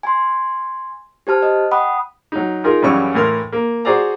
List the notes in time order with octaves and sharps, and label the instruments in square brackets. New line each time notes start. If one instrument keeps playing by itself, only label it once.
[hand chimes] G#5 C6
G4 C5 A5 F6
D#5
F#5 G5 B5 D#6
[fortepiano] F#3 D#4
D#4 F4 G#4 A#4
F#2 C#3 E3 G3 C#5 C#6
A2 E3 A#4 C6 F6
A#3
F#4 G#4 C5 D5 A#5